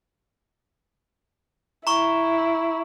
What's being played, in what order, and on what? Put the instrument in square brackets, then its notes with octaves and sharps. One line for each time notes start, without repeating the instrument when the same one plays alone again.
[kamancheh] E4 [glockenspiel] A#5 C#6